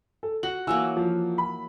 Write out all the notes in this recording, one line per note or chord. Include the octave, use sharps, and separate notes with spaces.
A4
F#4 F#7
E3 F#3 A#3 G#5 E6
F3
B5